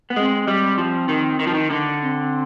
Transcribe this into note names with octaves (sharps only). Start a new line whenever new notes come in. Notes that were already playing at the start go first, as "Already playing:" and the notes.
B3
G#3 C4
G3
F3
D#3
D#3
F3
D#3
D3
C4